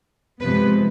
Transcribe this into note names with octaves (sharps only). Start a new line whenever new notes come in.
F2 C3 F3 G#3 B3 B4